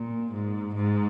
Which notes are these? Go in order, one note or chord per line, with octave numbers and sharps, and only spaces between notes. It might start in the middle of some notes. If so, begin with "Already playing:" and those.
Already playing: A#2
G#2
G#2